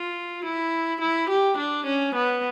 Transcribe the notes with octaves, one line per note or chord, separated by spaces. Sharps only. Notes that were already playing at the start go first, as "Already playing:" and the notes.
Already playing: F4
E4
E4
G4
D4
C#4
B3